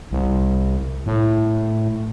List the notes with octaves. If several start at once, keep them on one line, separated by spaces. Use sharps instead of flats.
C2
A2